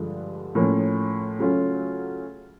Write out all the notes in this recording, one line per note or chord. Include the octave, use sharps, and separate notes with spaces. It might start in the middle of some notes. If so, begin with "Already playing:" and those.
Already playing: G2 D3 F3 G#3
A2 F3 A#3 C#4
C#3 F#3 A3 C#4 F4